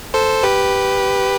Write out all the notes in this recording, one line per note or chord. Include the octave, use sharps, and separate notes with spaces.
A4 C5
G4 B4